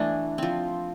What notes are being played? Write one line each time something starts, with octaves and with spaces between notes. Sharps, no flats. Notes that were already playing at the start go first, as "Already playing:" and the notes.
Already playing: E3 A3 B3 D4 E4
F3 C4